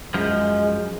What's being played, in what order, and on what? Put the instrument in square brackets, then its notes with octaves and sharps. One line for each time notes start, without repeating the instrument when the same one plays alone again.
[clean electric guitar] F#2 F3 [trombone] G#3